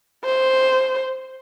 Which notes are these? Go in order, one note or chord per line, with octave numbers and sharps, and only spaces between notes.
C5